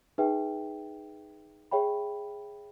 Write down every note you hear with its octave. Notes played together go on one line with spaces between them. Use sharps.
D#4 G#4 B4 E5 G5
G#4 C#5 E5 G5 B5